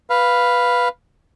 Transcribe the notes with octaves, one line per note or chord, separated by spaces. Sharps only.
B4 F5